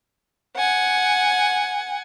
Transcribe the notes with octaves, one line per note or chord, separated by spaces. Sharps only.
F#5 G#5